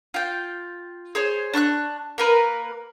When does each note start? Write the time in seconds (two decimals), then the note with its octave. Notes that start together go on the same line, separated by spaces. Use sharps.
0.14 F4 G5
1.15 G#4 C5 C#5
1.53 D4 C#6 F6 F#6
2.18 A#3 A#4 B4